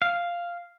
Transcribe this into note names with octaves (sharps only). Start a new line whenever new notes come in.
F5